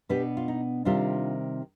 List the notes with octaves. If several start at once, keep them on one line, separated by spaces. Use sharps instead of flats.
B2 B3 D4 G4 B4
F4
D#4
C3 D#3 G3 C4 D4 F4